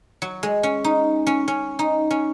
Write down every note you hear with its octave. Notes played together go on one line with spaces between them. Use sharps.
F#3
G#3
C#4
D#4
C#4
C#4
D#4
C#4